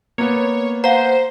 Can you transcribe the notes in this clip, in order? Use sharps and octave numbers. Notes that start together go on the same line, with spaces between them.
A#3 B3 C#5
C5 F5 F#5 A#5